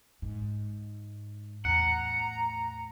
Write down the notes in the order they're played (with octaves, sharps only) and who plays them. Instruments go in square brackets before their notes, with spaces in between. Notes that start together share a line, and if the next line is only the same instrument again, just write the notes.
[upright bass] G#2
[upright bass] E2 A2 [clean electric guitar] F#5 [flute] A#5